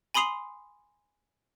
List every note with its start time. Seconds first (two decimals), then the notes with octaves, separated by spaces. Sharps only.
0.14 G#5 B5 C6 D#6 C7 F7